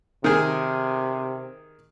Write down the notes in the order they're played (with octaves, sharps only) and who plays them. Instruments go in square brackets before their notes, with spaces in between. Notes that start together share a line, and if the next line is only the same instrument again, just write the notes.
[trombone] C3 [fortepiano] D#3 G#4